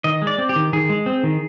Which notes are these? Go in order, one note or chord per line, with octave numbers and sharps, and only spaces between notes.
D#3 D#5
G#3
D5
C4
G4
D#3
D#3 G#4
G#3
C4
D#3